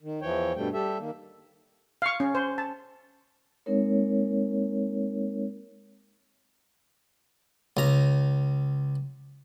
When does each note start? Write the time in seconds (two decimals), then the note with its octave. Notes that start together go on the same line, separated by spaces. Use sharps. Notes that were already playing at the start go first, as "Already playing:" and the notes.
0.02 D#3
0.22 E2 E3 F3 C#5 G5
0.56 G2 B2 G3 A3 G5
0.73 G3 G4 A4 E5
0.99 D#3 A#3
2.02 F5 C#6
2.20 C#4
2.35 C5
2.58 A5
3.66 G#3 A#3 C4 D#4 A#4 C#5
7.77 C#2 A#5